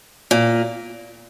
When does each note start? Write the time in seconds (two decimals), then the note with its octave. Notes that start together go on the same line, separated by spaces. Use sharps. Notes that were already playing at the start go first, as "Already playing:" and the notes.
0.31 A#2